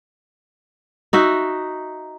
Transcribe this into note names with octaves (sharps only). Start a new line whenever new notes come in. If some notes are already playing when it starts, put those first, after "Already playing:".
D#4 F#4 E5